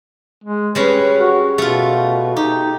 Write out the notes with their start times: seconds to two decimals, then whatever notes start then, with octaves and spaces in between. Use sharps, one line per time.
0.44 G#3
0.75 G3 G#3 C#4 B4
1.17 F#4
1.58 B2 A3 F4
2.36 D#4 G4